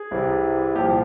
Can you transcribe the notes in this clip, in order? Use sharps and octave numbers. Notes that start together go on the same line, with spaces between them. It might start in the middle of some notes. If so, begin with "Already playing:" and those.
Already playing: G#4
C2 C3 E3 G3
C2 A#2 F3 G4
G4